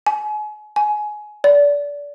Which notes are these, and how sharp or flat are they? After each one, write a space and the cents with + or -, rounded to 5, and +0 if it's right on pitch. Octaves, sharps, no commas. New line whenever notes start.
G#5 +35
G#5 +20
D5 -25